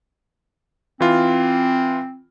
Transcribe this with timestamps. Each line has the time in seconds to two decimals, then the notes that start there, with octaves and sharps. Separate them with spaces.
1.01 E3 C4 F4